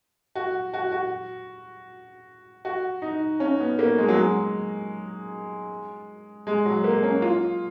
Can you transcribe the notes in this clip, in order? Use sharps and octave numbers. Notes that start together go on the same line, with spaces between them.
F#4
F#4
F#4
F#4
D#4
C#4
B3
A#3
G#3
F#3
G#3
G#3
F#3
A#3
C#4
F4